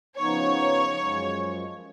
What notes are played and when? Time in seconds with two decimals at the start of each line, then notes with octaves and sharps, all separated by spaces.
0.18 C#3 F3 B3 D#4 C#5
0.99 F#2 F3 G#3